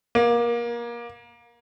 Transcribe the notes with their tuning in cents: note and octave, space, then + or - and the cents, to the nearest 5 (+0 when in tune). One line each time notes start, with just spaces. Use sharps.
A#3 +25